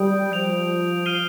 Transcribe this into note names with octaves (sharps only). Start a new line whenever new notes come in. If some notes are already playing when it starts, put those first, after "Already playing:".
Already playing: G3 D#6 G6 D7
F3 G6 D7 F7
F6 C7 D#7 G7